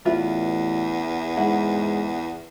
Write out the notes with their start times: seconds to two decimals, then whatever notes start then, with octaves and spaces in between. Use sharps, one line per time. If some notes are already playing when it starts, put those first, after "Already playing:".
0.05 A1 E2 F4 B4 E5
1.37 G#2 E4 F#5